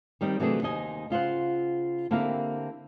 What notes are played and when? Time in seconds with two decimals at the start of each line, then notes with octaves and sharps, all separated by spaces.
0.21 D#3 G3 C4 D#4
0.40 C3 E3 F#3 A3 D4 G#4
0.62 D#2 D#4 C5 D#5 G#5
1.10 C#3 F4 C5 F#5
2.11 D3 A#3 C4 E4 G4 A#4